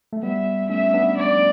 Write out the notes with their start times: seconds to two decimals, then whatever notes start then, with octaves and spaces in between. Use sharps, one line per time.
0.13 A3
0.23 G3 B3 E5
0.70 A3 C#4 E5
0.94 B3 D4
1.17 D5